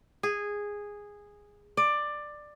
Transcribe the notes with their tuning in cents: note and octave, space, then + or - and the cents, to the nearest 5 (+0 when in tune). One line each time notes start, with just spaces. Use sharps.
G#4 -10
D5 +15